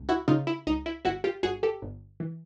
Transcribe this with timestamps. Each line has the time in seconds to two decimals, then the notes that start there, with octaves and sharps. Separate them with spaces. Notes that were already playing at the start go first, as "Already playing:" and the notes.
Already playing: C#2
0.09 E4 F#4
0.28 C#3 D#4 F4
0.47 E4
0.67 C#2 D#4
0.86 E4
1.05 G1 E4 F#4
1.24 F4 G4
1.43 G1 F#4 G#4
1.63 G4 A4
1.82 G1
2.20 E3